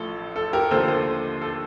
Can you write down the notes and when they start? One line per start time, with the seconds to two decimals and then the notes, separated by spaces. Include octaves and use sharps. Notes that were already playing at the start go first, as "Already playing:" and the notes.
Already playing: A1 A2 F3 A4
0.36 A4
0.53 G4 A#4
0.71 D#2 D3 F3 A4 C5
0.88 A4 C5
1.42 A4